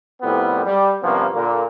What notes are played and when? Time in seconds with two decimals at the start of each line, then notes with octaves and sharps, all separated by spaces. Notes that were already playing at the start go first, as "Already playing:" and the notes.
0.22 C2 F2 A2 G3 B3 C4
0.66 G3
1.03 G2 C3 F3 A#3 B3 C#4
1.34 A#2 D3 A#3